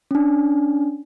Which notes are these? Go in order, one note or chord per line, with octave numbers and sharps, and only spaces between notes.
C#4 D4